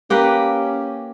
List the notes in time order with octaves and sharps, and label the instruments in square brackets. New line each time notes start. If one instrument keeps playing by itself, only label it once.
[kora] A#3 G4 B4 [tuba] C#4